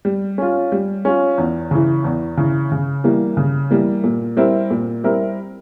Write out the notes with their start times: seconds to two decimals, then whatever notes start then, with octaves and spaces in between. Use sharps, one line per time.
0.05 G3
0.38 C#4 F4
0.72 G3
1.05 C#4 F4
1.38 E2
1.71 C#3 E3
2.04 E2
2.37 C#3 E3
2.72 C#3
3.04 E3 G3 A#3
3.37 C#3
3.70 E3 G3 A#3
4.04 A#2
4.37 G3 C4 E4 A#4
4.70 A#2
5.04 G3 C4 E4 A#4